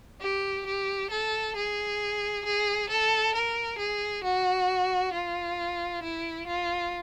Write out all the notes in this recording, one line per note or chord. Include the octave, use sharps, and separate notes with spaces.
G4
G4
A4
G#4
G#4
A4
A#4
G#4
F#4
F4
E4
F4